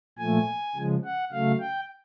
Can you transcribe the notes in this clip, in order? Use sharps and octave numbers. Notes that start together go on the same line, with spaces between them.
A#2 F3 A3 G#5
C#3 F3 G#3
F#5
C#3 F#3 A3 F5
G5